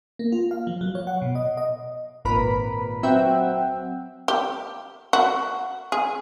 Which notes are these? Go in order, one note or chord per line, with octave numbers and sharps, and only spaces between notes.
A#3
F4
F5
F3
F#3
C#5
F#5
B2
D#5
D#5
G#1 A#2 A#4 B4 B5
F#3 C4 E5 F#5 G5
G4
F#4
G#4